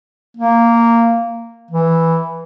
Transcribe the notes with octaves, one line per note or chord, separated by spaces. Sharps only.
A#3
E3